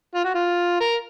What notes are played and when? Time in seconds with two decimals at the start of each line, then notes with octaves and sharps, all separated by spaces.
0.15 F4
0.24 F#4
0.34 F4
0.80 A#4